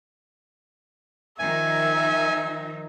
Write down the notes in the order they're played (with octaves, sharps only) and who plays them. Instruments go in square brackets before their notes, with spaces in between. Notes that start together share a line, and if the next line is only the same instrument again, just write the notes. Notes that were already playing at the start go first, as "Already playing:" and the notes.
[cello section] D#3 F3 D#4 [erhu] E5 [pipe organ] G#5